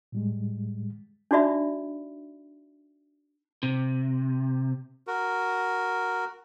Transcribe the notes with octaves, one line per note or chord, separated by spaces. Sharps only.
A2 G3 G#3
D4 D#4 F#4 D5 E5 B5
C3
F#4 A#4